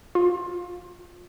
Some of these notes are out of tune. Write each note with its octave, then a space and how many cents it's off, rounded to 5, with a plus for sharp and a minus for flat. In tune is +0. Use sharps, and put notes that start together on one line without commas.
F4 +25